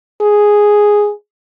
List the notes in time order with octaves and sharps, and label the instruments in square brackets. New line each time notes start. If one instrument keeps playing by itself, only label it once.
[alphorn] G#4